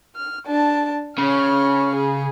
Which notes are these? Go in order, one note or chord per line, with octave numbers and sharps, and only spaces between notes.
F6
D4 A5
C#3 C#5 F6
G#4